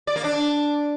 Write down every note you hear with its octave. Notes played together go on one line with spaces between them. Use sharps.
D5
A#3
D4